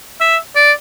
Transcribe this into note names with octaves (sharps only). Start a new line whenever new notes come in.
E5
D5